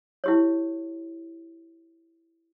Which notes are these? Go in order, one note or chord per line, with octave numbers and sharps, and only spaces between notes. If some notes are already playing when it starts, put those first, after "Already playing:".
E4 G4 C#5